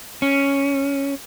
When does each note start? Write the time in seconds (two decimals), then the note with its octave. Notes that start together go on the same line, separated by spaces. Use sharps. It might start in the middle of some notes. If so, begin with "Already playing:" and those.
0.22 C#4